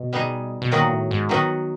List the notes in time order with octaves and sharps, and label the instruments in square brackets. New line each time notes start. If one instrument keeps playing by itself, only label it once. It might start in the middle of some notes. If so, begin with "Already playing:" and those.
Already playing: [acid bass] B2
[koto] G3 B3 D#4 G#4
[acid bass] B2
[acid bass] A#2 [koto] D#3 F#3 B3 D#4 F#4
[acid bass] A2
G#2
[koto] D#3 F#3 B3 D#4 F#4